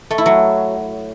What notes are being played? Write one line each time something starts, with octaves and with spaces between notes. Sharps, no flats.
A3
E4
F#3